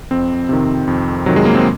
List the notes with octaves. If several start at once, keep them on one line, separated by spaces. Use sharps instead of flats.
F2 C4
C3 D#3
F2
C3 D#3 F#3
G#3
A#3
C4